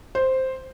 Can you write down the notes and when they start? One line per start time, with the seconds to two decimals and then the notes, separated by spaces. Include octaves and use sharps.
0.15 C5